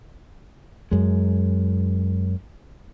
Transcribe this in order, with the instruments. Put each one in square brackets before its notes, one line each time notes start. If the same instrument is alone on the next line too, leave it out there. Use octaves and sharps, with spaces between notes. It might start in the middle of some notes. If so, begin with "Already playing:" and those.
[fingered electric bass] F#2 G#3